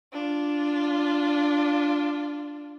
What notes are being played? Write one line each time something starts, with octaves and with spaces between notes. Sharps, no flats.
D4 F4